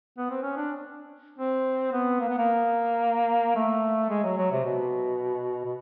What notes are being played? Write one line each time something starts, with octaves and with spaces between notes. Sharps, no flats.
B3
C4
C#4
D4
C4
B3
A#3
B3
A#3
A3
G#3
F#3
F#3
C3
B2
B2